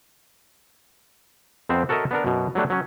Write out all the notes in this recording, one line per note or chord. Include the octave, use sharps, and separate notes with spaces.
F2 B3 C4
F#4 A4 A#4 C#5 D#5 E5
B3 D4 A#4
F#2 B2
F#3 G3 A3 D4
F#3 C#4